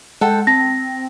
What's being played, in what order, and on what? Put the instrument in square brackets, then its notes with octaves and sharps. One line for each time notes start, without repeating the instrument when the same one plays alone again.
[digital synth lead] G#3 [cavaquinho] A4 F#5 G5
[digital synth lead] C4 [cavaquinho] A5 [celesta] A#6